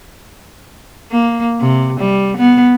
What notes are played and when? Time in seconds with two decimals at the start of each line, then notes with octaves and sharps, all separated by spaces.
1.12 A#3
1.60 C3
2.00 G3
2.37 B3